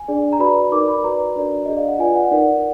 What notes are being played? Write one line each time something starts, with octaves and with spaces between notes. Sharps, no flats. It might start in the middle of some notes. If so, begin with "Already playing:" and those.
Already playing: G#5
D4 G#4 D5
A#5
F#4 B4 D5 B5
D#4 A#4 D5 D6
B5
F#4 B4 D5 A#5
D4 F#4 A#4 D5
D4 G#4 D5 D#5
F5
F#5
F4 B4 D5 G#5
F#5
D#4 A#4 D5 F#5